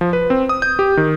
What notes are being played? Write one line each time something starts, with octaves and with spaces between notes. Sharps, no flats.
F3
B4
C4
D#6
G6
G4
D#3